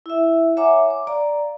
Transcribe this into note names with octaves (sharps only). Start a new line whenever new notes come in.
E4 E5
C#5 E5 F#5 G#5 A#5 D6
D6
D5 F5 A#5